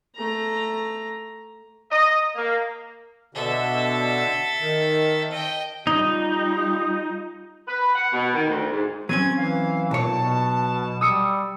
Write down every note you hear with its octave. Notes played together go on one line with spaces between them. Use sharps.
A3 A#5
D#5
A#3
B2 D3 A4 E5
D#3
D#5 G5
G3 D#4 F4
B4
F#5
B2
D#3
D2
G#2
F#3 C4 C#4 G#6 D#7
E3 F5
B1 A#2 C#5 A5
B2
G3 D#6 E6 C#7